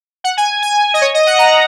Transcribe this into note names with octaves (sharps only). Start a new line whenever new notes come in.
F#5
G#5
G#5
D#5
C#5
D#5
F#5
A#5